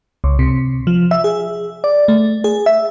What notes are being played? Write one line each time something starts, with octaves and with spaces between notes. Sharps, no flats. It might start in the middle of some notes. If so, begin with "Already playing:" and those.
C#2
C3
F3
E5
G#4
D5
A3
G#4
E5